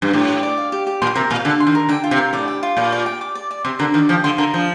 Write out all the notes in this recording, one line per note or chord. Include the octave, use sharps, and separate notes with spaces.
G2
A2 G4
G4
D5
F5
G4
G4
A#2 C6
C3 A#4
A#2 F5
D3 A5
C6
D#3
A#4
D3 G5
F4
C3
A#4
A2 D5
G5
F4
A#2 D5
D5
G5
D6
D5
D5
C3 C6
D3 A#4
D#3 D5
F3 G5
D3 C6
D3 A#4
F3 D#6